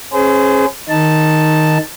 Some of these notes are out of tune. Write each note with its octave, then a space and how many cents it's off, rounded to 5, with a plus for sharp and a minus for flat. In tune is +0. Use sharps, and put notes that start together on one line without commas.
C#4 -35 G#4 +10 C5 -35
D#3 +0 D#4 +0 A5 +0